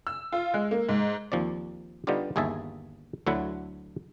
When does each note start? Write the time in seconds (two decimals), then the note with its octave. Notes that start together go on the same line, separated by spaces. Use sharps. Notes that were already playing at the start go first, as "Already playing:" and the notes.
0.07 E6
0.32 F4
0.54 G#3
0.71 A#3
0.89 G#2
1.32 D#2 F3 C4 D5
2.07 D3 G3 B3 D#4 F4 G4
2.36 G1 D#2 G#4 D#5 E5 A5
3.27 D2 D3 F#3 E4 E5 F#5